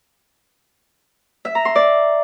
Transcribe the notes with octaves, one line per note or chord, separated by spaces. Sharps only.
E5
A#5
C6
D5